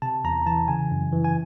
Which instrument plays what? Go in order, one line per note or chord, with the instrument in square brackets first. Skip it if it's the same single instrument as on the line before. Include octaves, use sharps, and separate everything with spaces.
[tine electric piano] C3 A5
E2 A#5
E3 A5
C#3 G#5
F#2
E3
G#5